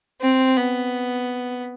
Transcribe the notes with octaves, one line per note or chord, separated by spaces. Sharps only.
C4
B3